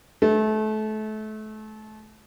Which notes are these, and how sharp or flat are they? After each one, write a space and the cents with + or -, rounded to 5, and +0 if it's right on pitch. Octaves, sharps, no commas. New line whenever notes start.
A3 -30